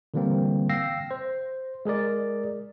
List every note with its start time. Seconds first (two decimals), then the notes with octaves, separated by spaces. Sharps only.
0.14 D3 E3 G3 A#3 C4
0.69 F5 G5 E6 A#6 C7
1.11 C5
1.85 G#3 G#4 A#4 D5